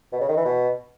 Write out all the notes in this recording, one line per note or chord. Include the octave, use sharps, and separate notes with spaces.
B2
C#3
D#3
E3
B2